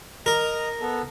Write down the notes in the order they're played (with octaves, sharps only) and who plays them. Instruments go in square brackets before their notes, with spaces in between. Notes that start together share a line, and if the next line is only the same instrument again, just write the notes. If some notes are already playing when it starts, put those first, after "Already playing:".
[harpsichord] A#4 [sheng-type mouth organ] D#5 A#5
[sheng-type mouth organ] B3 A4